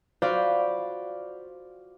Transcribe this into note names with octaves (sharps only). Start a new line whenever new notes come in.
F4 F#4 C5 D5 F5 B5